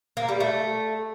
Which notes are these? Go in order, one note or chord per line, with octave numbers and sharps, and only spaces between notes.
A#3
G3
A3